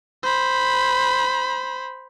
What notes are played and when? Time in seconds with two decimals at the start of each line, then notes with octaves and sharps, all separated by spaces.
0.23 C5 B5